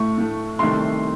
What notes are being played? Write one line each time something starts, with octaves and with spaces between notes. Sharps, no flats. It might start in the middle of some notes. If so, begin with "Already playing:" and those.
Already playing: A2 A3 C#6
A2 A3
C2 C3 D#3 A3 C6